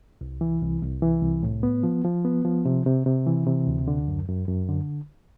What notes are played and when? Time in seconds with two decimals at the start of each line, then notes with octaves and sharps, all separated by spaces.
0.21 C2
0.41 E3
0.62 C2
0.82 C2
1.02 E3
1.22 C2
1.43 A2
1.63 B3
1.83 F3
2.05 F3
2.25 B3
2.45 F3
2.65 C3
2.86 C3
3.06 C3
3.27 E3
3.47 C3
3.67 D2
3.88 D3
4.08 F#2
4.28 F#2
4.48 F#2
4.69 D3